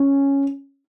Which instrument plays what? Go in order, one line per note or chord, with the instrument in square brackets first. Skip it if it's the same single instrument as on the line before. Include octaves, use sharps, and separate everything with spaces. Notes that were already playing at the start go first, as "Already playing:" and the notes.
Already playing: [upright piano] C#4